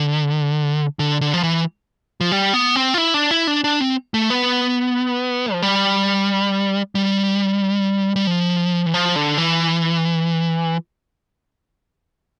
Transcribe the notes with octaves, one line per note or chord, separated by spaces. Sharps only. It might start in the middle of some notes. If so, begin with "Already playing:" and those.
Already playing: D3
D3
D3
F3
E3
F3
G3
B3
C4
F4
E4
D4
E4
D4
D4
C4
A3
B3
F3
G3
G3
G3
F3
E3
F3
D3
E3